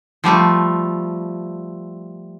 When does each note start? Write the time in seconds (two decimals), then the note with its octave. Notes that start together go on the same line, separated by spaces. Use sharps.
0.24 F3 G3 A3 F4